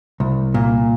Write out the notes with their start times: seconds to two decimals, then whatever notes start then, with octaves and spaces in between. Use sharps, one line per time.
0.20 C2
0.54 A#2